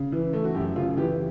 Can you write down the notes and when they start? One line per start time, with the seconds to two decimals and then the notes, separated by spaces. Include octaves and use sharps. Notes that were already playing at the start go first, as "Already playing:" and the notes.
Already playing: C#3
0.12 E3
0.33 A3
0.44 F#4
0.55 F#2 G4
0.76 C#3 F4
0.97 E3 G4